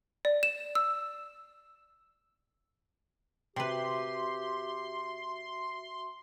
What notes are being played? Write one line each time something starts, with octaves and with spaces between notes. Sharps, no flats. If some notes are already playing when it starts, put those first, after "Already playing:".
D5
E7
E6
C3 F#4 G4 B4 E5 C6